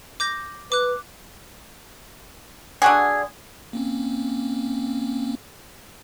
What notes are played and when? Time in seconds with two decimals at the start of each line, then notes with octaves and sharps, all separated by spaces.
0.20 D6 G6 A#6
0.72 B4 D6 F#6
2.82 D3 F#4 G#4
3.73 A#3 C4 C#4